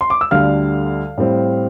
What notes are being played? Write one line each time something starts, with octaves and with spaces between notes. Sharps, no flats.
C6
D6
E6
D2 D3 G3 F5 F6
A2 G3 C4